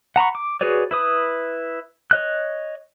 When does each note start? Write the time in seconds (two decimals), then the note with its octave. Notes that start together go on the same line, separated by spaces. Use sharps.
0.16 F#5 A#5 B5 C#6
0.35 D6
0.61 F#4 G#4 B4 C#5 D5
0.91 E4 B4 D#6
2.11 C#5 D#5 F#6